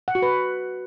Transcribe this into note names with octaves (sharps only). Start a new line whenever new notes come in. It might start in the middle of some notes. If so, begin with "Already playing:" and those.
F#5
F#4
B4